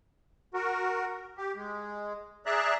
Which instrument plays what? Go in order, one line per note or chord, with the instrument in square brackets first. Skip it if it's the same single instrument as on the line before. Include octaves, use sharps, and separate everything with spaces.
[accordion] F#4 A#4
G4
G#3
G#4 D5 E5 A#5 F#6